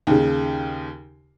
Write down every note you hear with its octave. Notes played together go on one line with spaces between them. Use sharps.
D#2 C#3